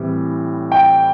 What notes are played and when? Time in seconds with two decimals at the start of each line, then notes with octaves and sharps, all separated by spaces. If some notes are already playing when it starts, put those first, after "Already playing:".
Already playing: A2 E3 G3 C4
0.72 G5